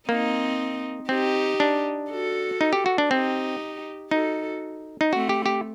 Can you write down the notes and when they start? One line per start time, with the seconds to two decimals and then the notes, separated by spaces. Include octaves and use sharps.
0.09 A#3 C4 D#4
1.09 C4 D#4 G4
1.60 D4
2.10 F#4 A4
2.61 D#4
2.73 G4
2.86 F#4
2.98 D4
3.11 C4 D#4 G4
4.11 D#4 F#4 A4
5.01 D#4
5.12 A3 C4 F#4
5.29 G4
5.46 G4